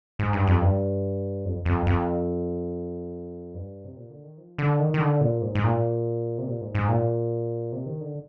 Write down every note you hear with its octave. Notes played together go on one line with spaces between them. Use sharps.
G#2
G2
F2
G2
F2
F2
F2
G2
C3
A#2
D3
D#3
F3
D3
D#3
D#3
D3
A#2
G#2
G#2
A#2
C3
A#2
G#2
G#2
A#2
C3
D#3
D3